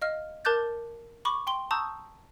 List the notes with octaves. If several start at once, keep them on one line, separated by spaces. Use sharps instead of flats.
D#5 F5 F6
A#4 A5 D6 F#6 G6 A6
B5 C#6 D6
G5 C6 G7
A5 A#5 C#6 D#6 E6 G6